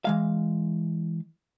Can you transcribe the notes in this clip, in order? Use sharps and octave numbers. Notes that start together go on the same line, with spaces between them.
E3 G#3 F5